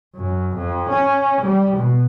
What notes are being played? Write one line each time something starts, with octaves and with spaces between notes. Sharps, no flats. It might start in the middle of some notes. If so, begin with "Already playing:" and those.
F#2
F2
C#4
G3
B2